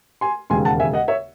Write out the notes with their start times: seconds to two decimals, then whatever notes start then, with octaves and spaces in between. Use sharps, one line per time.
0.21 G#5 C6
0.50 E1 D#2 C#3 G#3 G#5 C6
0.65 F#5 A5
0.80 E5 G#5
0.93 D#5 F#5
1.08 C#5 E5